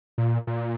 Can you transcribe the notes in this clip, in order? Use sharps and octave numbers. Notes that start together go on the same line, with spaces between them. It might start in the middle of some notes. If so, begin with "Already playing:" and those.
A#2
A#2